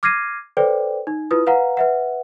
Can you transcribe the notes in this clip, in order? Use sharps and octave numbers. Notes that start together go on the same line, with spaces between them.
D6 F6 G#6 A#6 C7 D#7
A4 B4 C5 D5 G5
D#4
E4 F4 B4 D#6
B4 F5 F#5 A#5
B4 E5 F#5